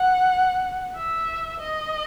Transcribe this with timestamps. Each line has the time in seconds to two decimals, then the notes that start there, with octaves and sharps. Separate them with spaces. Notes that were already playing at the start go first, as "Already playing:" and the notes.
Already playing: F#5
0.96 E5
1.60 D#5